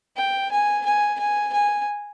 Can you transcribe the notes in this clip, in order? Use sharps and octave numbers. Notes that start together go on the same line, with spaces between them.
G5
G#5
G#5
G#5
G#5